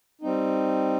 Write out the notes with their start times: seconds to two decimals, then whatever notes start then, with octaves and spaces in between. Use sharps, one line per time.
0.21 G3 C4 D#4